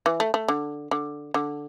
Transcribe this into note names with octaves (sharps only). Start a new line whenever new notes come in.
E3
A3
A3
D3
D3
D3